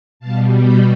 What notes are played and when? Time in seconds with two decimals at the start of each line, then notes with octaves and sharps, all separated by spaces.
0.19 B2 G3 F5 A5
0.62 G5 B5